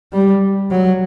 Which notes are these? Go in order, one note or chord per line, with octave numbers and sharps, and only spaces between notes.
G3
F#3